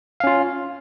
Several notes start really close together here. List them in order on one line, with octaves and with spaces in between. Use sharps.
F5 C#4 F4